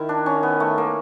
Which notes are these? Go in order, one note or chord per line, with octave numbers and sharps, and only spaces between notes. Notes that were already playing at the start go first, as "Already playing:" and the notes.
Already playing: D#3 E4 A#4
D4
C#4
B3
A3
A#3